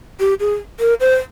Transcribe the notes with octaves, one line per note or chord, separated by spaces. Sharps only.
G4
G#4
A#4
C5